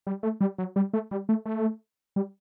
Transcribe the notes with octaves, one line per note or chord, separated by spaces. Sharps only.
G3
A3
G3
F#3
G3
A3
G3
A3
A3
G3